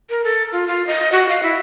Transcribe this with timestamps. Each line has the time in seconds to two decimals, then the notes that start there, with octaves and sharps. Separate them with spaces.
0.10 A#4
0.24 A4
0.52 F4
0.67 F4
0.87 D#5
1.12 F#4
1.29 F5
1.43 E4